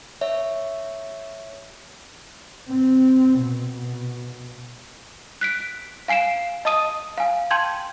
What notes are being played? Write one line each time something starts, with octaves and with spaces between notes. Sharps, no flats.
C#5 E5
C4
B2
F#6 B6 D7
F5 G#5 C7 D7 E7
D#5 A5 D#6 D#7
F5 G#5
G5 A5 C6 G6 G#6